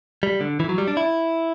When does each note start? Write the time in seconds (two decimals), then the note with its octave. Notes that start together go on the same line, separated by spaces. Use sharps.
0.23 G3
0.41 D3
0.60 E3
0.69 F#3
0.78 G3
0.88 D4
0.97 E4